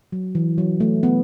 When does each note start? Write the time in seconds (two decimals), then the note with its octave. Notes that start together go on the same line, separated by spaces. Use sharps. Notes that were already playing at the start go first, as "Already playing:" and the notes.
0.12 F#3
0.35 E3
0.58 F#3
0.80 A3
1.03 B3